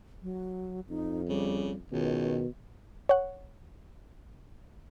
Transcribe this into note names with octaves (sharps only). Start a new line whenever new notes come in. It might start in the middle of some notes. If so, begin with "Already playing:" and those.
F#3
F2 D#4
C#3 G3
C#2 B2 D#3
C#5 F#5